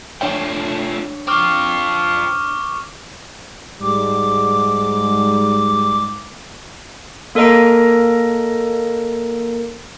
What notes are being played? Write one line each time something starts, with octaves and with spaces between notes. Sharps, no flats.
F3 A3 D4 C#5 G5
C4 F4 C#6 D6 F6
G#2 G3 D6
A#3 A4 A#4 D#5 A#5 D7